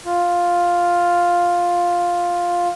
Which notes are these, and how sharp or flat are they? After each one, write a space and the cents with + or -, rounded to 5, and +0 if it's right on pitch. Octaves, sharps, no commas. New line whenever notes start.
F4 +5